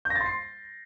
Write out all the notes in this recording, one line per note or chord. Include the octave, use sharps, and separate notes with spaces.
G6
A#6
A6
C6
C7